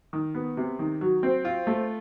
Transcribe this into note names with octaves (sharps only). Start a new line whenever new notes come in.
D#3
B3
C3
D#3
F#3
C4
F4
A3